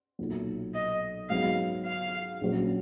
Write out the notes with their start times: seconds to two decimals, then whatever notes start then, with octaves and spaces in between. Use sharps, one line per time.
0.19 B1 A#2 F#3
0.74 D#5
1.30 G#2 F#3 B3 F5
1.86 F5
2.41 A#1 A#2 F#3 C#4